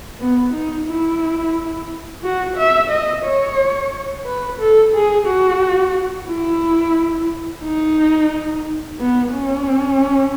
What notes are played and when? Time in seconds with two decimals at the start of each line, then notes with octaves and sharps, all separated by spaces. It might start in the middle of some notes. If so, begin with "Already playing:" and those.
0.20 B3
0.54 D#4
0.87 E4
2.23 F#4
2.57 E5
2.90 D#5
3.25 C#5
4.26 B4
4.60 A4
4.93 G#4
5.27 F#4
6.29 E4
7.64 D#4
8.99 B3
9.33 C#4